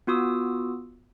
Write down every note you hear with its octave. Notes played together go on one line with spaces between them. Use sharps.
B3 F4 F#4 D#6 E6